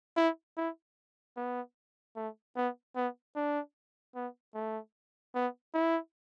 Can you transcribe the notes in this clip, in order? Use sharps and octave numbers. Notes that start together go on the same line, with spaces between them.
E4
E4
B3
A3
B3
B3
D4
B3
A3
B3
E4